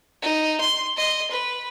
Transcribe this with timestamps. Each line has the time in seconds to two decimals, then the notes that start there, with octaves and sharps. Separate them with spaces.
0.22 D#4
0.61 C6
0.97 D#5 C6
1.31 B4